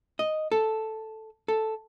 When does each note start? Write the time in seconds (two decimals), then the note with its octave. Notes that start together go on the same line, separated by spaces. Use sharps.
0.19 D#5
0.52 A4
1.48 A4